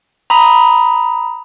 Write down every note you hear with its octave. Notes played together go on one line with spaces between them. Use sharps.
A#5 B5 D#6